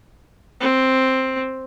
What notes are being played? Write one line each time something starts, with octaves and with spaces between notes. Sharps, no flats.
C4